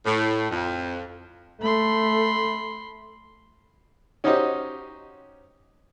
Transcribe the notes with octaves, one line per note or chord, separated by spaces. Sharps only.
A2
F2
A3 B5 C6
C#4 D#4 F#4 G4 C5 D#5